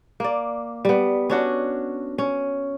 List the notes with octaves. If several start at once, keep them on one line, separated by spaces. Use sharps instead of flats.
A#3 D5
G3 B3
C#4 D4 F#4
C#4